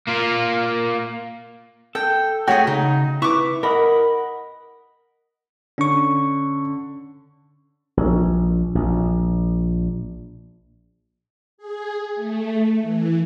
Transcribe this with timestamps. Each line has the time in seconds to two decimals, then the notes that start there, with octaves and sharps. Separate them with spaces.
0.08 A#3 F4
1.95 A4 G5
2.48 A3 F#4 G#4 C#5 G5
2.67 C#3 D#4
3.22 E4 B4 C#6 D6
3.63 A#4 D#5 F#5 B5
5.78 D3 C#4 C#6
7.97 A#1
8.75 A#1
11.58 G#4
12.15 A3
12.80 E3